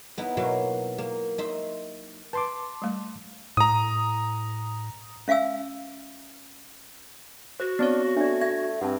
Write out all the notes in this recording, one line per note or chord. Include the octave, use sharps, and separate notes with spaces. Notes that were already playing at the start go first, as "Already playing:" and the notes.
B3 D#4 E4
B2 F#3 A#3
A#3
D#4 E5 C6
B4 A5 C6 D6
G3 A3
A2 A#5 D#6
C#4 E5 F5 G#5 E6
F#4 C5
B3 C4 D4 C#5
A3 D4 D5
E5 G#6
G2 C4 F#5 A5